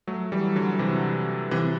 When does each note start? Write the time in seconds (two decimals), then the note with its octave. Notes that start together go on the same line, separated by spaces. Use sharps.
0.07 F#3 A3
0.32 E3 G3
0.56 D3 F#3
0.79 C3 E3
1.51 C3 E3